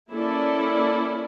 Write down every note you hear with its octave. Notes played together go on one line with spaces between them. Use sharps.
A#3 C#4 E4 A4 D5